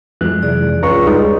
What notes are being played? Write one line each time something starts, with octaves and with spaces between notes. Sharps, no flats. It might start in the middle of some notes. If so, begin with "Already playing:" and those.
F2 E3 F#3 G#3 E4 F#6
C3 G#4 D5
C#2 F#2 F4 A#5 C#6 C#7
D2 G3 G#3 C#4 D#4 C6